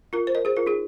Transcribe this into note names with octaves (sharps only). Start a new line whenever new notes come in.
F4 A#4
C5
A#4 D#5
G#4 C5
F4 A#4
D#4 G#4